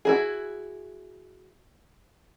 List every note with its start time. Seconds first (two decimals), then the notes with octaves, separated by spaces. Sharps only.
0.05 E4 F#4 G#4